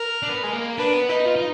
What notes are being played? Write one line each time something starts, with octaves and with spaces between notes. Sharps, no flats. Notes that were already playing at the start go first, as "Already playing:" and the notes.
Already playing: A#4
D4
B3
G#3
A#3
D4 B4
B3
D#4
F4
D#4